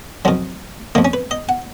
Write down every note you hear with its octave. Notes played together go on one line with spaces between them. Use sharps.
F2 D#3 F#3
F2 D#3 A#3
C#4
B4
D#5
F#5